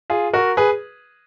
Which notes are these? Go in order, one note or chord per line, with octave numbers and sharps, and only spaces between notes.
F4 G#4
F#4 A#4
G#4 B4